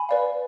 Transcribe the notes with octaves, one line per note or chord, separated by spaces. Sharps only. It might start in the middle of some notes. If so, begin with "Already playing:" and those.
Already playing: G#5 B5
B4 D5 F5